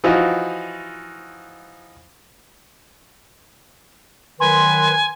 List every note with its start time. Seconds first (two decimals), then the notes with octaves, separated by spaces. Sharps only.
0.04 E3 F3 D#4 F4 F#4
4.40 D#3 F#3 B4 G#5 C6